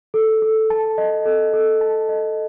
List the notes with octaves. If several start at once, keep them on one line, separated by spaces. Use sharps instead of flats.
A4
A4
A5
D#5
A4
A4
A5
D#5